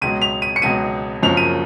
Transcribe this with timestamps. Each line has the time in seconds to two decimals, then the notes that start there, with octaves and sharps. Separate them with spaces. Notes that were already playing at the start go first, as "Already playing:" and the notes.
0.01 C#2 B2 F#3 D#7
0.22 F7
0.42 D#7
0.56 C#7
0.62 C#2 B2 F#3 D#7
1.23 F#1 F#2 C#3 F3 F7
1.37 D#7